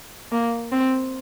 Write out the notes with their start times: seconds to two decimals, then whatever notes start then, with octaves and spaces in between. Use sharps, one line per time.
0.32 A#3
0.72 C4